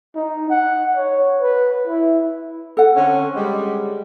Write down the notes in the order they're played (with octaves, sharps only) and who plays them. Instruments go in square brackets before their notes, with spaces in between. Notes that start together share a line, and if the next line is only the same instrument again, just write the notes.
[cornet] D#4
F#5
C#5
B4
E4
[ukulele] A4 F#5
[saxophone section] D3 C4 C#4
G3 G#3